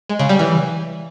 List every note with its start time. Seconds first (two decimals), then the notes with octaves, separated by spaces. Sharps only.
0.10 G#3
0.19 C#3
0.29 G3
0.39 E3